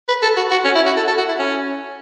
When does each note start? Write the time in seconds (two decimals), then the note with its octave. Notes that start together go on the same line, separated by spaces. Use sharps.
0.08 B4
0.22 A4
0.37 F#4
0.51 F#4
0.65 C#4
0.76 E4
0.86 F#4
0.97 A4
1.08 A4
1.18 F#4
1.28 E4
1.39 C#4